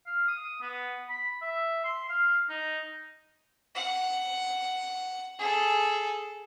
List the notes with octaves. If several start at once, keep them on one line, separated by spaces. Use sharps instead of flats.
F5
D#6
B3
B5
E5
C6
F5
D#4
F#5
G#4 A4